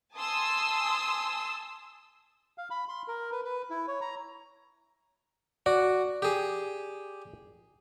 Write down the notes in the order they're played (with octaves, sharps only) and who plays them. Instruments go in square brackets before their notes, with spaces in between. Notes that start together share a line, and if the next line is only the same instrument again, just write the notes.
[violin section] G#5 A5 C6 D#6 E6
[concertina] F5
B5
C6
A#4
B4
B4
E4
C#5
A#5
[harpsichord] F#4 [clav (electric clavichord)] D5
[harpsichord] G4 G#4